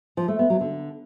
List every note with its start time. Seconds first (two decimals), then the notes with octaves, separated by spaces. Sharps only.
0.17 F3
0.28 A3
0.39 B3
0.50 F#3
0.61 D3